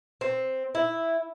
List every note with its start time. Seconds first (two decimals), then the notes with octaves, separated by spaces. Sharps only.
0.21 C4
0.75 E4